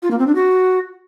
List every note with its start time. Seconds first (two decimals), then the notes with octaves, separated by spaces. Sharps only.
0.03 F4
0.11 A#3
0.19 C4
0.27 D4
0.35 F#4